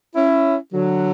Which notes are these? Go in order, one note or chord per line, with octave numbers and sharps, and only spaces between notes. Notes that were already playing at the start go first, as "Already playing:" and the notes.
C#4 E4
D3 F#3